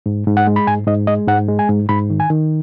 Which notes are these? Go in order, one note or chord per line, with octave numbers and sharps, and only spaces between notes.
G#2
G#2
F#5
G#3
B5
G#2 G#5
G#2 D#5
G#3 D#5
G#2 F#5
G#3
G#5
G#2
G#2 B5
D#3
G#5
D#3